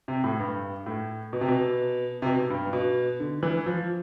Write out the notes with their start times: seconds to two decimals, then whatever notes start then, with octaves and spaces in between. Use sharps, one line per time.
0.08 C3
0.24 A2
0.39 G2
0.86 A2
1.33 B2
1.41 C3
1.48 B2
2.22 C3
2.26 B2
2.50 G2
2.73 B2
3.20 D3
3.43 E3
3.66 F3